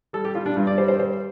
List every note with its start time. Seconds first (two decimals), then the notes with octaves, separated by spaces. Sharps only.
0.13 G3 A4
0.25 G4
0.35 G3 F4
0.46 D4
0.56 G2 F4
0.67 D5
0.78 G3 C5
0.88 C5
0.99 G3 C5